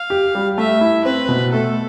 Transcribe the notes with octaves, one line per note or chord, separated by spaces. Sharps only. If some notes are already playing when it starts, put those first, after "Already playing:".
Already playing: F5
G4
G3
A3 E5
E4
C4 B4
B2
A3 A4